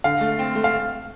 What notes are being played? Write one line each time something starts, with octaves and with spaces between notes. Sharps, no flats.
D3 F5
A3
C4
A3
F5